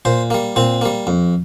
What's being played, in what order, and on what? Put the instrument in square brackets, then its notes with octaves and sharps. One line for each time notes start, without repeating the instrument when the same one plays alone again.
[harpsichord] A#2 C5
G3 A#3
A#2 C4
G3 A#3
F2